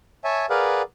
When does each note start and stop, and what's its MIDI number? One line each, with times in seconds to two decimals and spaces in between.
0.24 0.46 73
0.24 0.46 76
0.24 0.46 80
0.24 0.46 81
0.50 0.82 68
0.50 0.82 70
0.50 0.82 71
0.50 0.82 74
0.50 0.82 77
0.50 0.82 78